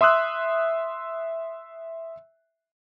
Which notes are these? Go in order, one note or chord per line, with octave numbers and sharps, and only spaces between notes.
E5 C6 D#6 E6 F#6